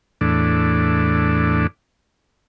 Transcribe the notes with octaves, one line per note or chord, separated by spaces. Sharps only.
E2 A2 D4